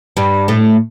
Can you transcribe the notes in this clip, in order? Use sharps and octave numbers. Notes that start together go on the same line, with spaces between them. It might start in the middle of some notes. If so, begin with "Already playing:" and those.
G2 G3
A2 A3